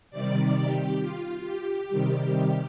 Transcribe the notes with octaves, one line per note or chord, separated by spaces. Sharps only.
C3 D#3 G3 D5
G4
F4
G4
C3 D#3 G3